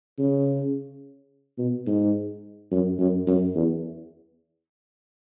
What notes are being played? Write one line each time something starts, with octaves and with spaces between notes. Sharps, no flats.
C#3
B2
G#2
F#2
F#2
F#2
E2